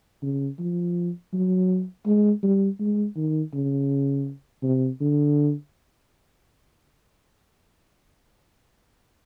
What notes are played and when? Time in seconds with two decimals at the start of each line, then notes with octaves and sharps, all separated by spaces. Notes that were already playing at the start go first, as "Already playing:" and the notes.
0.23 C#3
0.59 F3
1.33 F#3
2.06 G#3
2.43 G3
2.80 G#3
3.16 D#3
3.54 C#3
4.63 C3
5.01 D3